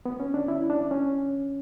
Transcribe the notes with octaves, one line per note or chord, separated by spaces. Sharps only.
B3
C#4
D4
E4
D4
C#4